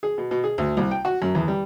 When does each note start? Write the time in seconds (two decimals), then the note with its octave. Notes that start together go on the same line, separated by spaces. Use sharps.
0.03 G#4
0.18 B2
0.31 B2
0.44 G#4
0.58 D2
0.77 C2
0.91 G5
1.05 F#4
1.22 F#2
1.35 E2
1.48 G3